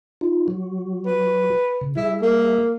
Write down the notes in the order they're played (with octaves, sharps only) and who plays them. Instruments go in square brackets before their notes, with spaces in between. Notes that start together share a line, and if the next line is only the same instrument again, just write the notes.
[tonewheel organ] D#4 F4
F#3 F#4
[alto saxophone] B4
[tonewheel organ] C#3
[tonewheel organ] G3 G#4 E5 [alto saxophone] E4
[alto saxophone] A#3